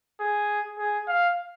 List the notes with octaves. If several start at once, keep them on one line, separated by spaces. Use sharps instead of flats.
G#4
G#4
F5